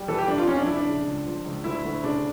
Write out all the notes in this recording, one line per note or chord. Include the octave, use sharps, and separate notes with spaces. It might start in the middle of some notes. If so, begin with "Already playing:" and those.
Already playing: G3
E3 A4
G4
F1 D4
F4
F1 C#4
D4
F1 E4
D4
C#3
C#2
F3
C#2
D2 E4
D2
C#3 D4